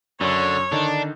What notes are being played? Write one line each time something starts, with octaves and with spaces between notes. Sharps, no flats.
F#2 D3 C#5
D3 D#3 D4 D#4